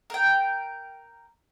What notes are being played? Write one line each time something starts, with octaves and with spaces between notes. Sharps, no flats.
A#4 G5